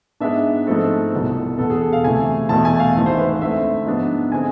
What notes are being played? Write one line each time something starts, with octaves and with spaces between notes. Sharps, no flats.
G#2 G#3 B3 D4 E5
G#2 F3 A3 C4 A4
C2 B2 B3
E1 E2 B2 B3 A4
G#4
A4
F5
D2 C3 E3 A3 G#5
E1 E2 B2 A3 A5
G#5
F5
G#1 G#2 E3 A3 E5
C5
B4
C5
D2 D3 A3 C4 E5
G#2 F3 B3 D4
D3 G#3 C4 G#5